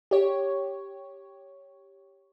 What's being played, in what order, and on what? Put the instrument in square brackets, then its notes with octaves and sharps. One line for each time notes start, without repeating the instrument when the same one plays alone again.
[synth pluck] G4 C#5